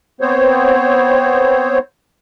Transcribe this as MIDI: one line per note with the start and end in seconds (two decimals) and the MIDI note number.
0.21 1.79 59
0.21 1.79 60
0.21 1.79 72
0.21 1.79 73